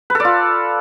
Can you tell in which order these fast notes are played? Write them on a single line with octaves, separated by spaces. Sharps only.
B4 A4 D5 F4